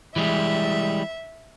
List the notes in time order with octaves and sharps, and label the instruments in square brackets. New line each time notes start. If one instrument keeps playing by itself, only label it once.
[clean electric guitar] E3 G3 G#3 [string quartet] E5